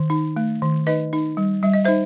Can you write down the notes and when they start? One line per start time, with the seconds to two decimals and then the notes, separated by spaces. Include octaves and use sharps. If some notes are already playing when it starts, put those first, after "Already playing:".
Already playing: D#3
0.10 D#4
0.36 A3
0.62 D#3
0.87 D#4 B4 D#5
1.13 D#4
1.37 G3
1.63 G3 E5
1.73 D#5
1.85 D#4 C5 E5